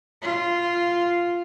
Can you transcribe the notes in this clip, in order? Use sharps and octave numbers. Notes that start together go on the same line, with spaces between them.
F4